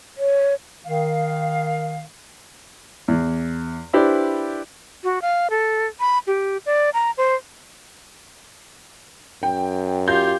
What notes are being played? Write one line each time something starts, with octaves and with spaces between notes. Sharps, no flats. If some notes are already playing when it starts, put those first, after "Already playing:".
C#5
D#3 F5
E2
D4 E4 G4 B4 C5 D5
F#4
F5
A4
B5
G4
D5
A#5
C5
F#2 G5
F4 G4 G6